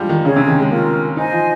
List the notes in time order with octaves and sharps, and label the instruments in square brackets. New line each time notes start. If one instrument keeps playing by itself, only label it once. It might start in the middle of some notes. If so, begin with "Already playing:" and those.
Already playing: [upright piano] F3 G3 G#3
D#3
[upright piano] C#3 [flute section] C#4 G#4 C#5
[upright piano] C3
D#3
G#3
[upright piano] A#3 [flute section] C#4 F4 A#4
[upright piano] D#4 [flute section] C5 D#5 G#5
[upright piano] F3